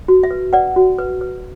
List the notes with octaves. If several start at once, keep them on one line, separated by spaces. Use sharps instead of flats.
F#4
E5
B4
B4 D5 F#5
F#4
B4
B4